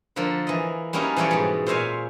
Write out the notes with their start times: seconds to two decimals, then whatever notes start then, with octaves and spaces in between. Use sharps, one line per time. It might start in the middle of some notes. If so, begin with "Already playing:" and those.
0.16 D3 F3 A#3 A4
0.47 E3 D#5
0.93 G3 A#3 C#4 D#4 E4 F#4
1.16 E3 F3 G3 A4 C#5 D5
1.31 G#2 B2
1.66 A#2 C5 C#5 E5 F5 G#5